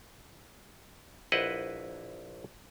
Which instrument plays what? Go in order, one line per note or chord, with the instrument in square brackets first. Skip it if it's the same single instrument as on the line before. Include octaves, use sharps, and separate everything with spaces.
[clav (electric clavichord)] A#1 E4 B4 C5 D#5 F#5